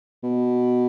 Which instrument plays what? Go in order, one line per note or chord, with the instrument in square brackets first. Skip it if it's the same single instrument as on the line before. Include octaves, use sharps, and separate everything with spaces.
[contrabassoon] B2